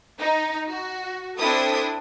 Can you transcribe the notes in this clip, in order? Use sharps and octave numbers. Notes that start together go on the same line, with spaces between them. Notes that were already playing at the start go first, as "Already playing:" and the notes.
D#4
F#4
C4 D4 E4 A4 D#6